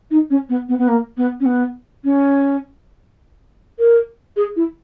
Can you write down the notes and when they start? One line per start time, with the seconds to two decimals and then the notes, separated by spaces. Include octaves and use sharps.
0.11 D#4
0.30 C#4
0.49 B3
0.69 B3
0.79 B3
0.88 A#3
1.17 B3
1.40 C#4
1.46 B3
2.04 C#4
3.79 A#4
4.37 G#4
4.56 E4